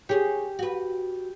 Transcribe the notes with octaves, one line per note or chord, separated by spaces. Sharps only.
G4 G#4 C#5
F#4 B4